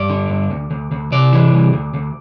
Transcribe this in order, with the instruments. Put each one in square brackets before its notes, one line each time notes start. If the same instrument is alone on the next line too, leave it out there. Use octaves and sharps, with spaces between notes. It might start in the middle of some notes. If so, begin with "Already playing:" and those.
Already playing: [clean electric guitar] G2 D5
D3
G2
D2
D2
D2
C3 D5
E3
C2
D2
D2